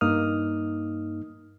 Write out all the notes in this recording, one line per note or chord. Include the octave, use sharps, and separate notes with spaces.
G2 A#3 D#4 D#6 F6